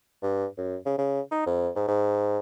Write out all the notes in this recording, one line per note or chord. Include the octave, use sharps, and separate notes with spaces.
G2
F#2
C#3
C#3
D#4
F2
G#2
G#2